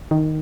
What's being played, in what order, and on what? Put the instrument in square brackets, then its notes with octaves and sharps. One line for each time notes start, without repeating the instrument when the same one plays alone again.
[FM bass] D#3